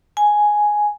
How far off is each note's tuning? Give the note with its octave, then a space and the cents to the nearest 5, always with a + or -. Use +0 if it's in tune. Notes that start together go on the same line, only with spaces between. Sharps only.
G#5 +5